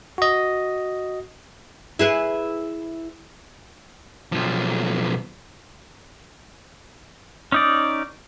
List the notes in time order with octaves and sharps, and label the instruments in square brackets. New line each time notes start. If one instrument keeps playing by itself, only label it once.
[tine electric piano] F#4 D#5
[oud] E4 G#4 B4
[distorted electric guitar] B1 F3
[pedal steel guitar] C#4 D#4 D5